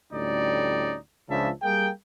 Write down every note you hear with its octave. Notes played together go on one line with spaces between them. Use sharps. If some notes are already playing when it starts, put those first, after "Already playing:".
D2 A2 G3 C#4 D#4 D5
C#2 C#3 F3 D4 E5 A5
G3 A#3 G#4 G5